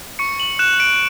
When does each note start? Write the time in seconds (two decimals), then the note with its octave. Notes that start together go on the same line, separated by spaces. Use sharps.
0.19 C#6 C#7
0.40 F#7
0.59 F#6 E7
0.80 D7